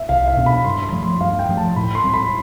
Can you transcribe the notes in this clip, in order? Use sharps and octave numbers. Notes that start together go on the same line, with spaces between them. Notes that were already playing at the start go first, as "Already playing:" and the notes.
Already playing: E5
C2 F5
F5
B2 B3 D4
B5
G2 C6
B5
F3 A3
C6
G2 F5
G5
F3 A3
A5
A2 B5
C6
G3 C4
B5